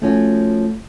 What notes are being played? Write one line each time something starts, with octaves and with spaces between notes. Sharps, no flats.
F3 A3 C#4 F#4